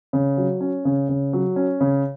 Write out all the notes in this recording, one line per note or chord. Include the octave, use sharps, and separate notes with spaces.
C#3
F#3
C#4
C#3
C#3
F#3
C#4
C#3